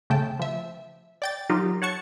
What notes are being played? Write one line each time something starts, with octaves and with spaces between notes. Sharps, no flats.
C#3 A3 G5 A5
F3 E5
D5 G5 A6
F#3 D#4 F4 G4 A#4
C#5 F#5 A5 C#6